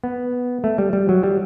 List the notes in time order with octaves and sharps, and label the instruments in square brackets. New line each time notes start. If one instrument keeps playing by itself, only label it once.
[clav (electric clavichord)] B3
A3
G3
G3
F#3
G3